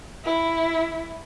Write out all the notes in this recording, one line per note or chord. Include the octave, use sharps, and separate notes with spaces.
E4